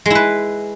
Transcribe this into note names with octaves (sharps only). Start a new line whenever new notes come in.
G#3 E4 B4